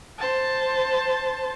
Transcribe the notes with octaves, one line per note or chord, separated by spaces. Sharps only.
C5 A5